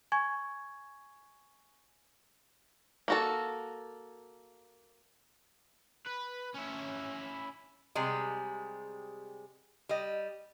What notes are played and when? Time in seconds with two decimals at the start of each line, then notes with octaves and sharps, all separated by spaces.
0.12 G#5 C#6 G#6
3.08 A#3 F#4 A4
6.06 B4
6.54 C#4 E4
7.95 C3 G3 G#3 G#4
9.89 G3 D#5